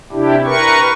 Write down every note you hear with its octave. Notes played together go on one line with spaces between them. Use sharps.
C3 D4 E4 G4
A#4 B4 C#6